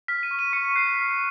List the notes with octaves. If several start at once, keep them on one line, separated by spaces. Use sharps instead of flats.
F6 B6
D#7
C#6
D#7
C#6 C#7
C#7
F#6 C7
B6
F6